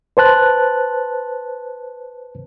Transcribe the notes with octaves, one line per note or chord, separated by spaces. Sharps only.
B4 C5 A5 F#6